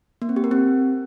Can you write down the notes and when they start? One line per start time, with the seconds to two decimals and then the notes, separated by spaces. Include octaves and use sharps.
0.22 A#3
0.29 C4
0.36 G4
0.44 A#4
0.51 C4